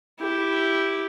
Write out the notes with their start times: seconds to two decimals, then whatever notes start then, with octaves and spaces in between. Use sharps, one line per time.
0.20 E4 G4